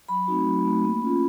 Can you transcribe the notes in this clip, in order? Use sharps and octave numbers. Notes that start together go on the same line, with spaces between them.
F#3 B5
A3 C4 D#4 F#4
F#3
A3 C4 D#4 F#4
A#3
C#4 F4